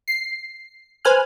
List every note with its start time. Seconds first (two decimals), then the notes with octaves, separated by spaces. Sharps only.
0.08 C7
1.05 B4 C5 G#5 F6 F#6